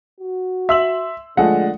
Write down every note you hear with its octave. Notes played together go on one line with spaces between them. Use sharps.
F#4
E5 C6 E6 F#7
D3 F3 G#3 A3 F#5